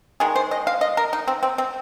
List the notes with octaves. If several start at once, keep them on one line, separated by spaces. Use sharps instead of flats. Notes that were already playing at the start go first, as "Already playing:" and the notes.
D#3 G#3 G#4
C5
D#5
F5
D#5
A#4
D#4
C4
C4
C4